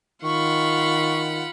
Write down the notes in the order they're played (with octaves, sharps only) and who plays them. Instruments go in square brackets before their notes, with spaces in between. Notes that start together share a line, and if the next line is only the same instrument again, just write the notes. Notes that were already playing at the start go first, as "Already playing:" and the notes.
[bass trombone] D#3 [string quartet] F4 F#5 B5 [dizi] C#6